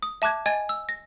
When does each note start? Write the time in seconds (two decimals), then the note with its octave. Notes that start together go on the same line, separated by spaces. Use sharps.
0.02 D#6
0.22 E5 A5 D6 F#6 G#6
0.46 D#5 G#5 G#6 A6 D#7
0.69 E6
0.89 A#6